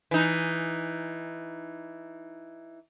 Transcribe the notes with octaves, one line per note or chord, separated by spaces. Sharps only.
E3 D#4